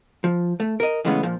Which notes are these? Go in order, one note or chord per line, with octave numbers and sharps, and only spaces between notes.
F3
A3
A#4 D#5
C#3 E3 G#3 A3 B3 C#4
A#2 F3